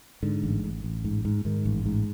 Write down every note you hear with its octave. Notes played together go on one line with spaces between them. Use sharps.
G#2 D3
A1
A1
A1
G#2
G#2
G#2 D#3
A1
G#2